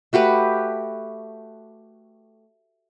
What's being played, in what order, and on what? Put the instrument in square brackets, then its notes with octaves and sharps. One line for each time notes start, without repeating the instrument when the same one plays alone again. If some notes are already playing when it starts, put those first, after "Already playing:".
[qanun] A3 F#4 G4 B4